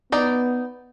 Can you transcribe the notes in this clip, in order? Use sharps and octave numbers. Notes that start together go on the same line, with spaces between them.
B3 D#4 D5